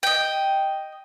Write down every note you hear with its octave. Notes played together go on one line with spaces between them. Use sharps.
D#5 G5